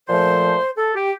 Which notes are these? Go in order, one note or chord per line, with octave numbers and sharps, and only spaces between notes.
A#2 F3 A3 C5
A4
G4